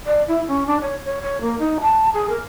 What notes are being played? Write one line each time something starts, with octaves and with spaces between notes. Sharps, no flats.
D5
E4
C#4
D4
C#5
C#5
C#5
A#3
D#4
A5
G#4
A#4